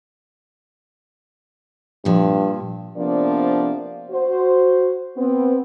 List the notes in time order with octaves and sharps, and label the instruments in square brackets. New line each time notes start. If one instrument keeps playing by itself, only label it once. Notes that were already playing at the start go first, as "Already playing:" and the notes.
[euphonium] G2 [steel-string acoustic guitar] A#2 F3
[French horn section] C3 F3 A#3 B3 D4 D5
F#4 C5
B3 C4